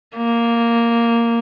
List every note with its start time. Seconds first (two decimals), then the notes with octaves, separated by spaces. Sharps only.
0.16 A#3